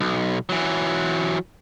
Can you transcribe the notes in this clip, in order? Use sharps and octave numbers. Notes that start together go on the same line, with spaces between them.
B1
E3 F#3